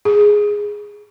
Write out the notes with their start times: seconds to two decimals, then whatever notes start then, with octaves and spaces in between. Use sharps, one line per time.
0.05 G#4